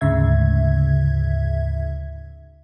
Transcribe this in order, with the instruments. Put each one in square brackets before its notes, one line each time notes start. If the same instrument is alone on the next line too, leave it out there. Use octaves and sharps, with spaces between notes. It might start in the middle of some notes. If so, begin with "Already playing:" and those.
[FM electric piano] D2 G#2 C#3 E5 G#6